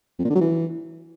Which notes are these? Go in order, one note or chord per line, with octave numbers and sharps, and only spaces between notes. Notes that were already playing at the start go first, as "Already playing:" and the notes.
F2
A#2
D3
F#3
E3